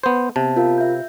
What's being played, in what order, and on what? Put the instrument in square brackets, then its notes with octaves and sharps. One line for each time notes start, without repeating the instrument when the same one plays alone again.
[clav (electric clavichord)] B3 C5
[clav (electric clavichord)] C3 [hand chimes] B3 A5
[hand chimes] F4 A#4 F5
E5 G6